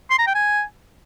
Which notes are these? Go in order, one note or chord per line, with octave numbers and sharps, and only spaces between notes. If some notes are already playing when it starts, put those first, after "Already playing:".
C6
A#5
G5
G#5